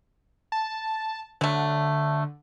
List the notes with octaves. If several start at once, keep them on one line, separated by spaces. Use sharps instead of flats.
A5
D3 F#3 A3